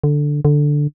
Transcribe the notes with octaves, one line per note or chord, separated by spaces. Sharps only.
D3
D3